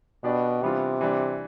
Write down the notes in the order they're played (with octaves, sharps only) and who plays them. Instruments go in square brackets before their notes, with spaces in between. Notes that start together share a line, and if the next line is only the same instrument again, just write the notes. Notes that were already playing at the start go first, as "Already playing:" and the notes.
[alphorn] B2 [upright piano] B3 D4 G4 D5
[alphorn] C3 [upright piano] E3 G3 B3 D4 F4
[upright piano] E3 G3 D4